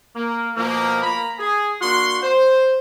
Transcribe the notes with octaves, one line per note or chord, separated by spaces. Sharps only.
A#3
B2 F3 A#3
A#3 A#5 B5
G#4
A#3 D4 F#4 C6
C5